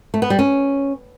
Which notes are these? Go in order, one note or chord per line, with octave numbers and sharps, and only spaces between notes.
A3
B3
G3
C#4